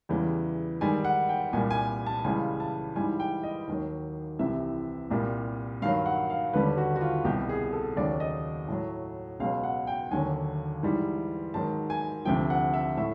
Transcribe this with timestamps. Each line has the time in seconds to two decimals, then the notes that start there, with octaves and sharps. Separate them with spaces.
0.09 E2 C#3 E3 G3
0.81 G#2 D#3 G3 G#5
1.04 F#5
1.29 G5
1.53 C2 A#2 G3 G#5
1.71 G#5
2.06 A5
2.24 C#2 C#3 E3 G3 G#5
2.60 A5
2.96 G#2 E3 G3 G#5
3.20 G5
3.43 D#5
3.68 D#2 D#3 F#3
4.39 C2 C3 E3 E5
5.10 C2 A#2 G3
5.82 G2 D#3 F#3 F5
6.06 F#5
6.30 F5
6.53 D#2 D3 G3 B4
6.77 F#4
6.96 F#4
7.01 F4
7.25 C2 B2 G3 G4
7.49 G#4
7.73 A4
7.96 D#2 C#3 F#3 D5
8.20 D#5
8.68 A2 F#3
9.40 C#2 B2 F#3 F5
9.64 F#5
9.87 G5
10.11 D#2 D3 F#3 G#5
10.83 G#2 E3 G3
11.54 G#2 D#3 F#3 A5
11.90 G#5
12.25 D2 C3 F3 G5
12.50 F#5
12.74 E5
12.97 A2 E5